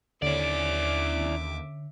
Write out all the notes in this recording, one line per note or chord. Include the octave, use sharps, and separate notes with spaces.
D#2 D3 C#4 E4 D5 E5 D6